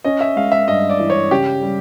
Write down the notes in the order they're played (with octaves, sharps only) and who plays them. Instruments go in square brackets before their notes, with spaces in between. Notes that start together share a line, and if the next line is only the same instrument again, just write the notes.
[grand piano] C#4 [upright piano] D#5
[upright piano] E5
[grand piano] G#3 [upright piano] F5
[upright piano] E5
[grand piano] G2 [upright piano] D#5
[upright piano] D5
[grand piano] E3
[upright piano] C#5
[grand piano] C#3 [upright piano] G4
[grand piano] G3